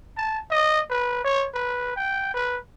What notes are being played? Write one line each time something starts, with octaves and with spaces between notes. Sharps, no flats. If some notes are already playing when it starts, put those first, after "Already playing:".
A5
D#5
B4
C#5
B4
G5
B4